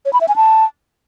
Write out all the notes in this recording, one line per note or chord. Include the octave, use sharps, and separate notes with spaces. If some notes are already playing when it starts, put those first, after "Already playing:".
C#5
B5
E5
G#5
A5